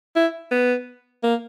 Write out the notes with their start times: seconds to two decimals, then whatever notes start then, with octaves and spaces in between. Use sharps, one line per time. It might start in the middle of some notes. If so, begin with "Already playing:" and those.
0.16 E4
0.51 B3
1.23 A#3